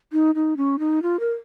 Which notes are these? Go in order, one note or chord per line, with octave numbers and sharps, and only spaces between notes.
D#4
D#4
C#4
D#4
F4
A#4